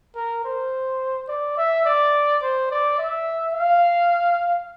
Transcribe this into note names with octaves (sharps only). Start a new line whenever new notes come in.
A#4
C5
D5
E5
D5
C5
D5
E5
F5